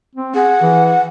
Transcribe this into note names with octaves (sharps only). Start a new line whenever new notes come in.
C4
G#4 F#5
E3